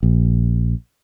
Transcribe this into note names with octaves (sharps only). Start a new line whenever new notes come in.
A#1